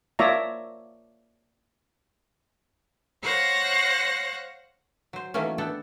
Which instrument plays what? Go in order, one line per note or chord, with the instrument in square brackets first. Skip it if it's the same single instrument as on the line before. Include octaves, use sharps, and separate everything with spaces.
[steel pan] A#3 F4 C#5 D5 E5 A#5
[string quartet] C5 C#5 F5 F#5 F#6 A#6
[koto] F#3 C5
D#3 E3 F#3 A3 A#3 C#4
B3 D4 A4 F#5 G5